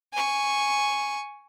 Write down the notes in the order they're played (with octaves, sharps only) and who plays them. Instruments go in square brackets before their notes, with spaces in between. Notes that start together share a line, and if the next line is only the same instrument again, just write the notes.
[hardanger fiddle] G#5 C#6